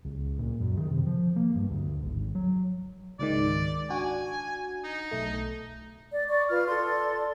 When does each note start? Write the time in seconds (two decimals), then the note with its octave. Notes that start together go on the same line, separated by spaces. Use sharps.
0.05 C#2
0.38 A#2
0.60 F#2
0.77 D#3
0.91 C3
1.06 F3
1.36 A#3
1.55 G2
1.71 D2
2.03 G#1
2.35 F#3
3.19 C#2 G#2 D#3 D5
3.90 D4 F#4 G#5
4.84 D#4
5.11 B1 A3
6.11 D5
6.29 D5 C#6
6.48 F4 B4 F6
6.67 A4 D5 C6